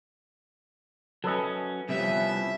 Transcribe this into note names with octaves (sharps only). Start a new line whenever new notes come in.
F#3 C#4 A4 B4 D#5
C3 F3 G3 B3 C#4 E4 E5